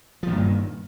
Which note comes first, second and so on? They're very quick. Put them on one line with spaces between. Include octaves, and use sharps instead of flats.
F3 A#2 G2 D#3